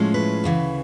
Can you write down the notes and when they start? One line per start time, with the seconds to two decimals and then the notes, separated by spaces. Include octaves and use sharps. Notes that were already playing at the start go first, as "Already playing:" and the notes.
Already playing: A2 F3 G#3 C#4
0.14 B4
0.44 D2 C#3 E3